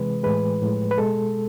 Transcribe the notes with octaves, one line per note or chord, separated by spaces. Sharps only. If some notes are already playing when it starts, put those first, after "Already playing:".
Already playing: C3 E3 G#3 B4
A2 E3 G#3 B4
A2 F3 G#3
B4
B2 G#3 A4